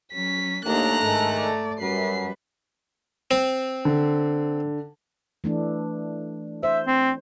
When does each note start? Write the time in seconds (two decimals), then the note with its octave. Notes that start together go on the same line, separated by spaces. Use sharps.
0.13 F#3 C#4 B6
0.66 D#2 A3 A#3 D4 A#5 F#6
1.03 G#2 D#3 G#3 A4
1.38 D5
1.80 F#2 G3 B4 C7
3.31 C4
3.85 D3
5.44 E3 A3 D4
6.63 C5 E5
6.87 C4